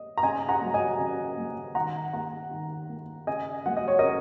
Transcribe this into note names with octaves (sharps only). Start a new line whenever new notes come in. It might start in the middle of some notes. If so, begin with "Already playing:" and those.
Already playing: D#5
A#5
C#3 D#5 G#5
F#5 A#5
F#3 A#3
D#5 G#5
C#3
F#3 A#3
D#3 F#5 A#5
A#3 F#5 A#5
D#3
A#3
C#3 D#5 G#5
F#3 A#3 F#5
D#5
C#5
C#3 A#4 D#5